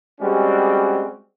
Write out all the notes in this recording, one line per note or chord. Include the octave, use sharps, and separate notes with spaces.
G3 G#3 C4 C#4 F#4